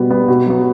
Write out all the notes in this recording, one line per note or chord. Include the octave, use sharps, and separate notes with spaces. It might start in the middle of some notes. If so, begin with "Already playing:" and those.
Already playing: B2 G3 B3
G3 B3
B2
F#3 B3